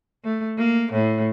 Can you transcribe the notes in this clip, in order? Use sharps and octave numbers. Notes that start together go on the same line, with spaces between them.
A3
A#3
A2